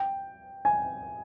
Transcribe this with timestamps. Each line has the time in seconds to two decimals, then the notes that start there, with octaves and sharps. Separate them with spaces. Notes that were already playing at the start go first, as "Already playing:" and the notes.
Already playing: G5
0.65 G#5